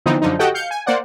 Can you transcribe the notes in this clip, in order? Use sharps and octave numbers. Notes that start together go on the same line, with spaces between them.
D3 E3 F3 B3 C4 D#4
F#2 D3 F3 D#4
F#4 G4 A4 D#5 F#5 G5
F5 G6 C#7
G#5
A#3 C5 D5 F#5